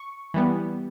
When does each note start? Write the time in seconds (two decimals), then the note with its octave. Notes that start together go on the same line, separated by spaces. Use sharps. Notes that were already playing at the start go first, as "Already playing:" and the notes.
Already playing: C#6
0.34 E3 G3 B3